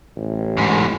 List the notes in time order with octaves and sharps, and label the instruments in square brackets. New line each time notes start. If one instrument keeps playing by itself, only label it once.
[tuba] A1
[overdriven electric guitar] E2 G#2